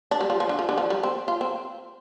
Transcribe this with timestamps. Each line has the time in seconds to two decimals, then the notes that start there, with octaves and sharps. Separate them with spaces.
0.11 D4
0.21 G3
0.30 F3
0.40 F3
0.49 D3
0.59 F3
0.69 D3
0.78 F3
0.90 G3
1.03 C4
1.28 F4
1.41 C4